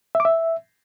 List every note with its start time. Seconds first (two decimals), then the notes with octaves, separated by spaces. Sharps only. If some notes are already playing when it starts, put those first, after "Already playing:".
0.15 E5
0.20 D6
0.25 E5